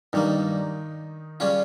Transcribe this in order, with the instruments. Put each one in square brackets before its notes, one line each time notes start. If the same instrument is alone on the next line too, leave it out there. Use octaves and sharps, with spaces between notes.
[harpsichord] G2 G3 A#3 [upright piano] D#3 D#4
[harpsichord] C#3 G3 C#4 F4